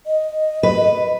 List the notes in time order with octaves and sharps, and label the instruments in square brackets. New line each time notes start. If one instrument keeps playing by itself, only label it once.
[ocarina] D#5
[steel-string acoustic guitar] B4